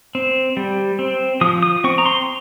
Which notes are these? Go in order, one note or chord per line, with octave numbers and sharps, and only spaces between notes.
C4
G3
C4
F3 D#6
D#6
C4 C#6
A#5
C6